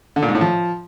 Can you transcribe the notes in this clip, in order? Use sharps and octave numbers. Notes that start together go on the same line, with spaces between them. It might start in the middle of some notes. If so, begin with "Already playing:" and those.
D3
A#2
G#2
A2
F3